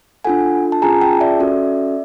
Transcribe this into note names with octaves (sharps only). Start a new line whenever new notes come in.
D4 F4 A4 F#5 G#5
A5
C#4 F4 G#4 G#5 A#5
G5 A5
D5 E5
C#4 F#4 A4